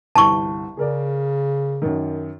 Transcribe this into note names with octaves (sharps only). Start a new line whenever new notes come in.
G1 C2 A5 C#6
C#3 G#4 A#4 D5
F#2 D#3